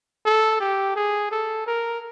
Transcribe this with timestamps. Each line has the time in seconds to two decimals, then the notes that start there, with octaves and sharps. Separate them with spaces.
0.25 A4
0.60 G4
0.96 G#4
1.31 A4
1.67 A#4